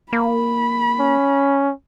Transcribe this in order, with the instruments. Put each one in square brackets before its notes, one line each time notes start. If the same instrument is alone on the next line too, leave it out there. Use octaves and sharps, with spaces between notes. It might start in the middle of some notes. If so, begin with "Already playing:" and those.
[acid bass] A#3 [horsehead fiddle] B5
[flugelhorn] C#4